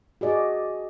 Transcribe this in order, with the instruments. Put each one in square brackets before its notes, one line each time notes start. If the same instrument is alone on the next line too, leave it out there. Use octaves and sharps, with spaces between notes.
[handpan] F#4 G#4 D5 D#5